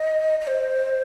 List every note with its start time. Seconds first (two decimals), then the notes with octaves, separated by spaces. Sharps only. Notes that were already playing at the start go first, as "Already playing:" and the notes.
Already playing: D#5
0.40 D#5
0.47 C5